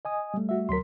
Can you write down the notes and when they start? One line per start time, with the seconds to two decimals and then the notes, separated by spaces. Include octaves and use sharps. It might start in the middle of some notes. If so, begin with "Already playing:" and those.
0.05 D#5 G#5 D#6
0.34 G3 A3
0.49 F#4 E5
0.69 D2 F#3 A#4 C6 B6